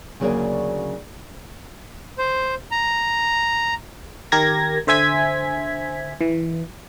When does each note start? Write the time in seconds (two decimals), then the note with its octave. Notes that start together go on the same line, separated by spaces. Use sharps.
0.20 D2 C#3 F#3 A#3 G#4 D5
2.18 C5
2.71 A#5
4.32 D#3 G4 A#4 G#6 A#6
4.87 D3 C5 E5 G#5 G#6 B6
6.21 E3